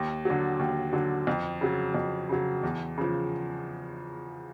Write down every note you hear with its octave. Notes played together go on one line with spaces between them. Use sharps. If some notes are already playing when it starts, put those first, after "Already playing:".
Already playing: D#2
D3 F#3
D#2
D3 F#3
F2
C#3 F#3
F2
C#3 F#3
E2
C#3 F3